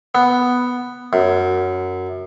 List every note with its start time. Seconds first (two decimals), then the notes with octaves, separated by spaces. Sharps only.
0.15 B3
1.13 F#2